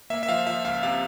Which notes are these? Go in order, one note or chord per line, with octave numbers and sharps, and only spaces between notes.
A#3 E5
E5
F3 F5
F3 E5
C#2 F5
C3 F5